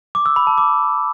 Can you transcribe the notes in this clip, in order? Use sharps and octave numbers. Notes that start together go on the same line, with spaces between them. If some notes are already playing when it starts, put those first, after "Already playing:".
D6
E6
B5
A5
D6